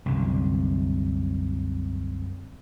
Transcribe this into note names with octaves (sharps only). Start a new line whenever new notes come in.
C2 F#2 D3